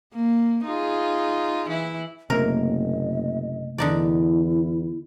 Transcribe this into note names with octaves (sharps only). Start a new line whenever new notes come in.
A#3
D#4 F4 G#4
E3 E4
F#1 C3 A3 A#3 A#4 D#5
E2 D3 D#4 E4 D5